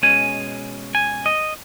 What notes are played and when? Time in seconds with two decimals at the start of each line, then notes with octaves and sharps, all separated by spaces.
0.02 B2 G#3 C#4 G#5
0.95 G#5
1.26 D#5